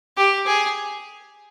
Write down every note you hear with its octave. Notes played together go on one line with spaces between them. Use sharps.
G4
G#4